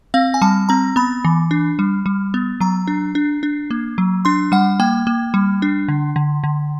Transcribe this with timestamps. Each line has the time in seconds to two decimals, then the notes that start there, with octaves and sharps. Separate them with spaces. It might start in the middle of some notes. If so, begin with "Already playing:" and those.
0.14 C4 F5
0.34 G#5
0.42 G3 A5
0.69 C4 A#5
0.96 B3 B5
1.25 E3
1.51 D4
1.79 G3
2.06 G3
2.34 B3
2.60 F#3 A#5
2.88 D4
3.15 D4
3.43 D4
3.71 A#3
3.98 F#3
4.25 D4 C6
4.52 G3 F#5
4.80 A#3 G5
5.07 A#3
5.34 G3
5.62 D4
5.88 D3
6.16 D3
6.44 D3